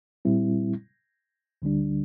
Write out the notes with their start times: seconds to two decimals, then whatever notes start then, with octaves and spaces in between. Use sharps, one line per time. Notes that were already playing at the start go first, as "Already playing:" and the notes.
0.25 A#2 G3 C4 E4
1.62 D2 D3 G3 D4